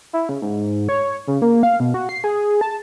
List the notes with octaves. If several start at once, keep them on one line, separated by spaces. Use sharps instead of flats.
E4
C#3
G#2
C#5
C#3
A#3
F5
B2
F#4
C7
G#4
A5